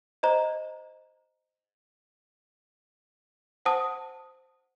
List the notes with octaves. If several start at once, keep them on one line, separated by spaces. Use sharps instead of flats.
C5 D#5 A#5
C5 F#5 A5 D#6